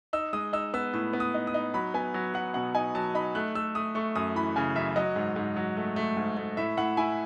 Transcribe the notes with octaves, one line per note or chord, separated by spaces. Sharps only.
D#4 E6
G#3 D#6
D#4 E6
B3 E6
A2 E6
B3
D#6
D#4
D#6
D#4
F#3 B5
B3 G#5
F#3
F#3 F#5
B2 F#5
D#4 G#5
F#3 A5
D#4 B5
A3 F#6
A3 E6
A3 D#6
A3 C#6
F#2 D#6
E3 B5
C#3 G#5
F#2 E5
F#3 D#5
G#2
G#2
F#3
A3
A3
G#2
A3
A2 E5
A2 F#5
E4 G#5